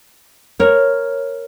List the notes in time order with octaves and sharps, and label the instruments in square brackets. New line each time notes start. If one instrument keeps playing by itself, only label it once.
[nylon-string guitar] A#4 C#5